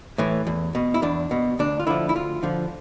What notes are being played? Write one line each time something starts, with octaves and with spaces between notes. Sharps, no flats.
A2 E3
E2
B2
E4
E2 D4
B2
D2 D4
F4
D3 F3 E4
E4
D2 F4
D3 F3